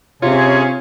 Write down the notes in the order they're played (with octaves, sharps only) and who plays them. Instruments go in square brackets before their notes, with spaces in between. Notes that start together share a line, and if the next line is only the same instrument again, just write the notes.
[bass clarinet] C3 [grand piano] C4 F4 [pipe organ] C#4 G#4 [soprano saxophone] C#5